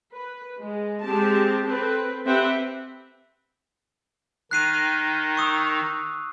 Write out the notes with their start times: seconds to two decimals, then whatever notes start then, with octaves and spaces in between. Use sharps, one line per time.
0.13 B4
0.60 G#3
1.03 G#3 C4 G4 A5
1.65 C4 A4 B4
2.25 C4 G4 B4 E5 F#5 G5
4.51 D#3 D#4 F#6 C7 D#7
5.37 C#6 D#6 E6